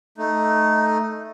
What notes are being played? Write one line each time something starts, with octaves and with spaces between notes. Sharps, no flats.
A3 D#4